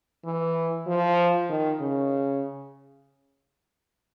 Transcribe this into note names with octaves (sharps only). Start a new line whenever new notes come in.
E3
F3
D#3
C#3